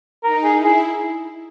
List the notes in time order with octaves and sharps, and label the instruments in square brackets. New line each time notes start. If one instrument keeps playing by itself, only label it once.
[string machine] D#4 [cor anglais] A#4
[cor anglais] G#4
[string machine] E4
[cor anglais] G#4